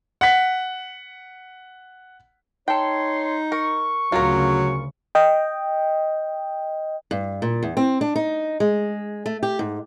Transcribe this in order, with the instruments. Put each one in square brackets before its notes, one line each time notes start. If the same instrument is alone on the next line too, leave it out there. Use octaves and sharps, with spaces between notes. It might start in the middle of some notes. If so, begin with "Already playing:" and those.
[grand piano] F#5 B6
[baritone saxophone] D#4 [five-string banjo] A4 G5 [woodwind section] C#5 C6
[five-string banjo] A#4 [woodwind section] C#6
[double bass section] D2 C#3 [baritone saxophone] F#3 [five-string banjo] F4 A#4
[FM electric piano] D#5 G5
[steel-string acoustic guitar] G2
A#2
E2
C4
D4
D#4
G#3
A3
G4
G#2